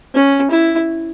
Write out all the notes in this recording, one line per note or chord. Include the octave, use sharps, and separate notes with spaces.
C#4
E4